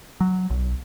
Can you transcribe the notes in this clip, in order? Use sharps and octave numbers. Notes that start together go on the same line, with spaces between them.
F#3
B1